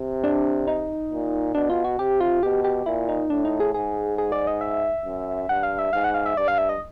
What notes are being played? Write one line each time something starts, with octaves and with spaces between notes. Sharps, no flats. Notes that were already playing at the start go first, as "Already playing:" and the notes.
Already playing: C3
D4
D#4
A#2
B2 D4
F4
F#4
C3 G4
F4
B2 G4
G4
A#2 E4
D#4
A2 D4
D#4
G#4
G#2 G#4
G#4
D5
D#5
E5
F#2
G2 F#5
F5
E5
G#2 F5
F#5
F5
E5
G2 D5
F5
E5
D#5